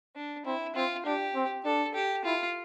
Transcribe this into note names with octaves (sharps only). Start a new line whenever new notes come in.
D4
C4 E4
C4 F4
D4 G4
C4
D4 A4
G4
E4 F4